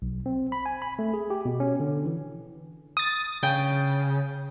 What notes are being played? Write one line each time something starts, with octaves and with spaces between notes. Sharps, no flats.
B1
C4
B5
G#5
B5
A3
G#4
G4
B2
C#4
D3
E3
D#6 A6
C#3 G5